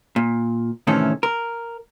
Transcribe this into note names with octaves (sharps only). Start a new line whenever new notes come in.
A#2
A2 C3 D#3 E3 C#4 A4
A#4